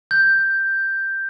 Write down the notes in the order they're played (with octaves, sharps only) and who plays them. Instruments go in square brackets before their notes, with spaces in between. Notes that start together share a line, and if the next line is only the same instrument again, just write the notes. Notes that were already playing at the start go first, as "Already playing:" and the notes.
[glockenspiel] G6